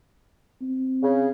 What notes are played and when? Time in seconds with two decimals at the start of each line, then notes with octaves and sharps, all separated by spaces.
0.62 C4
1.02 C#3